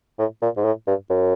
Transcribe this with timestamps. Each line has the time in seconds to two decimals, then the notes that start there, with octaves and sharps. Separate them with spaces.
0.19 A2
0.42 A#2
0.57 G#2
0.64 A2
0.87 G2
1.10 F#2